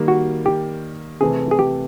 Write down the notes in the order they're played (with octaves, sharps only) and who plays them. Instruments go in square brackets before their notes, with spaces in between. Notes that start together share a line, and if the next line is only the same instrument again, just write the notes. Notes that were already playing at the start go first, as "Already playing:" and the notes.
Already playing: [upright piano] D#3 G3 A#3
[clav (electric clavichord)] F#4
G4
[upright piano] C3 E3 A3 [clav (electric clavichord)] G#4
[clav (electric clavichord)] G#4
G4